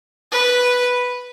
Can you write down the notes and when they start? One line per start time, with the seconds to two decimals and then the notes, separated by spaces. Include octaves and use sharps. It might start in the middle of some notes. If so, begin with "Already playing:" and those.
0.32 B4